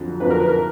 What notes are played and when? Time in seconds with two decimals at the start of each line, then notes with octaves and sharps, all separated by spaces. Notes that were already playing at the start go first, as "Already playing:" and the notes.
Already playing: F2 D3 F#3
0.20 F2 D3 F#3 B4
0.30 A#4
0.40 B4
0.48 A#4